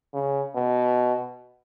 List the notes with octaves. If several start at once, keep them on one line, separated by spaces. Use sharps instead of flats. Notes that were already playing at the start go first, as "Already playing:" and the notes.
C#3
B2